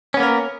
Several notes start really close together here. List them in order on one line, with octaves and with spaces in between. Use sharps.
C#4 B3 A#3 A#4